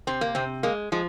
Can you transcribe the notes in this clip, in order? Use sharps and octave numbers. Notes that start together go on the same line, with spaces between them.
C3 C4
A#3
C3 C4
G#3 A#3
F3 G#3